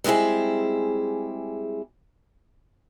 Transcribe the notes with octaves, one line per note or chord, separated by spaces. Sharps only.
G3 G#3 C4 E4 G#4